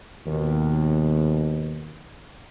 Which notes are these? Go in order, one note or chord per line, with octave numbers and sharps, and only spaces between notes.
D#2 B2